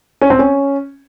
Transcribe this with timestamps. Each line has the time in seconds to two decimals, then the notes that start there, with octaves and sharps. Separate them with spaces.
0.21 C#4
0.30 C4
0.39 C#4